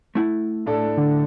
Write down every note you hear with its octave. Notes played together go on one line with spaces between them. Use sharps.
A3 E4 F#5
A2 D4 A4
D3